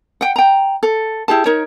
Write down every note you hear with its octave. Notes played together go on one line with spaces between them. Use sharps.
F#5 G5
G5 A#5
A4
E4 G4 G#4 A5
D#4 A#4 C#5